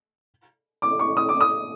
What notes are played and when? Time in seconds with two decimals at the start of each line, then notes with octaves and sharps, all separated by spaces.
0.82 D6
0.99 C#6
1.17 D#6
1.29 D6
1.41 D#6